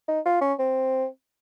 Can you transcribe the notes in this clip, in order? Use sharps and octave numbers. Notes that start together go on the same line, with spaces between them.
D#4
F4
C#4
C4